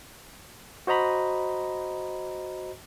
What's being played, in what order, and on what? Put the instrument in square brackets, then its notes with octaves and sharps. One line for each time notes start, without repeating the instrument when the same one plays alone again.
[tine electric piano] F#4 C5 D#5 A#5 B5